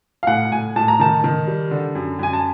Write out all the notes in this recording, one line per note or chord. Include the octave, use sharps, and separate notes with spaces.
F5
A2 F#5
A2 G#5
A2 A5
A#5
D#3 A5
D#3
G3
D3
F#2
F#2 G#5
A5